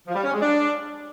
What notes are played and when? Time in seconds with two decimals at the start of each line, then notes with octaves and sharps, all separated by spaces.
0.07 F3
0.15 G3
0.24 C#4
0.33 G#3
0.41 D4